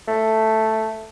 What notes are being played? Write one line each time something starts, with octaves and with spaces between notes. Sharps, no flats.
A3